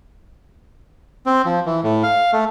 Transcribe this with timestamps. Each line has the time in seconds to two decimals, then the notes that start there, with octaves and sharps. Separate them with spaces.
1.26 C4
1.45 F3
1.66 E3
1.84 A2
2.03 F5
2.33 A3